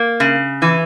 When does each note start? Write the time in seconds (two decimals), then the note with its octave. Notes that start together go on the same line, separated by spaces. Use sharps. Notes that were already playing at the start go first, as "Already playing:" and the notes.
Already playing: A#3
0.20 C#3
0.62 E3